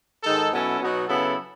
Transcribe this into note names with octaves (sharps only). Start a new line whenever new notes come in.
G#2 D#3 G#3 D#4 A4
B2 F#3 C#4 E4 A4
B2 F#3 B3 D#4 F#4
C#3 F#3 B3 E4 A4